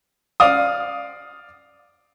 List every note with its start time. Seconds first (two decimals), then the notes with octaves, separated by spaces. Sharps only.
0.40 D5 F5 D#6